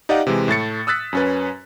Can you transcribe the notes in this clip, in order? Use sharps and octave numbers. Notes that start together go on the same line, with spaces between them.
D#4 G4 D5 D#5 F5 F#5
C3 E3 G#3
A2 A3 A6 C#7
D#6 E6 F#6 A6 B6
F#2 C#4 B4